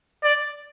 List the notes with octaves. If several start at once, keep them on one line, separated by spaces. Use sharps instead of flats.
D5